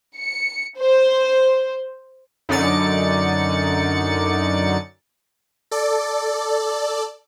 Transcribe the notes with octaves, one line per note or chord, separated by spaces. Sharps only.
C#7
C5
F#2 D3 D#4 D5 A6 C#7
A4 D5